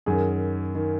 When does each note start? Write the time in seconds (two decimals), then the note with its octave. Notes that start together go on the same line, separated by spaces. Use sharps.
0.06 F#2 D#3 G#4
0.75 D#3